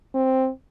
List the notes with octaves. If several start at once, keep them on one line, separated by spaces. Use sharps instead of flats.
C4